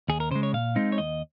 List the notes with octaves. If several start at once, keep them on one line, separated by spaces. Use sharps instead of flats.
D#2 G#4
A#4
C#3 G#3 C5
C#5
A#2 F5
G#3 C4 D#4
C#5
D#2 D#5